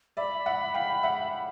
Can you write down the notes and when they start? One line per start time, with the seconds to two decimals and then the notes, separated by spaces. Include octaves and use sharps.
0.17 D5 E5 B5
0.46 E5 F#5
0.74 F5 G5
1.03 E5 F#5